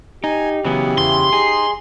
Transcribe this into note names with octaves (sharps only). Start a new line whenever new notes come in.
D#4 G4 G#5
C#3 E3 F#3 B3
E2 C6
D#4 G#4